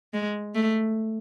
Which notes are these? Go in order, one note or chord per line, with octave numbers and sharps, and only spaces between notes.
G#3
A3